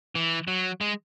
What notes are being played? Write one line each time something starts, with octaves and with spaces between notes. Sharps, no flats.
E3
F#3
G#3